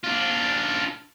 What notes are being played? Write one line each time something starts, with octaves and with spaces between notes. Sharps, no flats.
D4 F4